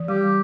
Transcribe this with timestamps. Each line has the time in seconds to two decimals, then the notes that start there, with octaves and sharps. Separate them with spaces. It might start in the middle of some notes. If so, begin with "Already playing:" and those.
Already playing: E3
0.08 G3 G4